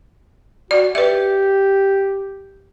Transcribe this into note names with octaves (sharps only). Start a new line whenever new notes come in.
F#4 D5
G4 B4 E5